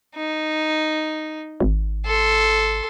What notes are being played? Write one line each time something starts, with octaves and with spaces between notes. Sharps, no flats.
D#4
G#1
A4 C6